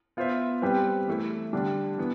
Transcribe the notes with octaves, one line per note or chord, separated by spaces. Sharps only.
B3 F4 C5 E5
G3 C4 G4 B4
E3 A3 E4
D3 G3 D4
E3 B3